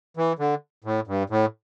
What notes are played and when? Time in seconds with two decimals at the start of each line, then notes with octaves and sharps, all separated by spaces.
0.17 E3
0.39 D3
0.84 A2
1.07 G2
1.30 A2